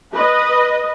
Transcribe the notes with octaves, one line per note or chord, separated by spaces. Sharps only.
B4 D#5